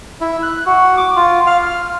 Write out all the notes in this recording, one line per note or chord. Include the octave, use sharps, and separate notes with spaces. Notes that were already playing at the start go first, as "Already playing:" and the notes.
E4
F#6
F#4
D6
F4
F5
F6